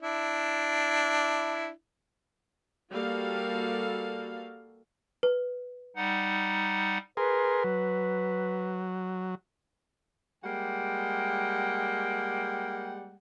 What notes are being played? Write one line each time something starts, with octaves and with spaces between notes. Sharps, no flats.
D4 E4
G3 A#3 F#4 A4 F5
B4
G3 D#4 F#5
G#4 A#4 B4 C6
F#3
G3 G#3 A#3 F#5 G5